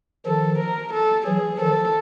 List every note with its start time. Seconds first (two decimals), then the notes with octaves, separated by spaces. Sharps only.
0.26 D#3 F3 A4
0.60 A#4
0.93 A4
1.27 E3 F#3 G#4
1.60 D#3 F3 A4